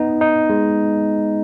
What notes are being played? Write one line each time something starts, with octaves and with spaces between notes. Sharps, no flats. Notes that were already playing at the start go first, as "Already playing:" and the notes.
Already playing: B3 D#4
D#4
G#3